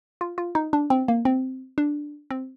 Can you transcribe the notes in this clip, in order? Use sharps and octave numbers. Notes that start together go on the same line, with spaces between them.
F4
F4
D#4
D4
C4
A#3
C4
D4
C4